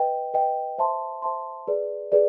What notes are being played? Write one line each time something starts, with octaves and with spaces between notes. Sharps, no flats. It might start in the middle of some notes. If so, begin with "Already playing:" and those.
Already playing: B4 D#5 G5
B4 D#5 G5
C5 E5 A5 C6
C5 E5 A5 C6
G#4 B4 D5
G#4 B4 D5